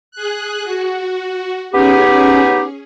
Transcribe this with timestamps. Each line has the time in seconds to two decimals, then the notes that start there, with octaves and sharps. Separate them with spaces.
0.12 G#4 F#6
0.64 F#4
1.73 B3 C#4 D#4 G4 G#4